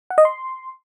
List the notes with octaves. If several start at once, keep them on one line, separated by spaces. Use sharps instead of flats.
F#5
D#5
C6